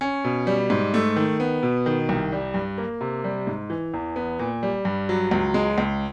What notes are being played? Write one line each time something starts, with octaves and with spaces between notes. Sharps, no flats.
C#4
B2
G3
G#2
A3
D#3
B3
B2
D#3
C2
G3
G2
A#3
C3
G3
G#2
E3
E2
B3
A#2
G3
G2
F#3
C#2
G#3
C#2